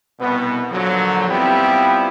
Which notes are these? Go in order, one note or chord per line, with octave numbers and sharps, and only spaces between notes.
C2 B2 B3
A#2 D3 F3 F#3
G3 B3 C4 E4 F4 G4